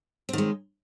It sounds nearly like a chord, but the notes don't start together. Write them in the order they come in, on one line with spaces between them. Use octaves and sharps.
C4 D#3 G#3